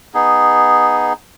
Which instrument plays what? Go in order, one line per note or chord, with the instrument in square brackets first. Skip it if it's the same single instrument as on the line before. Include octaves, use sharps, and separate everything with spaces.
[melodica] B3 D#4 G#4